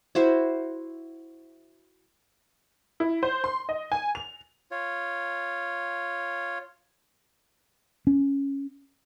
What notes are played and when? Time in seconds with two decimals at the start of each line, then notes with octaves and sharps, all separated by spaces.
0.15 E4 F#4 C5 E5
3.00 E4
3.23 C5
3.44 C6
3.69 D#5
3.92 G#5
4.15 F7
4.71 F4 C#5
8.07 C#4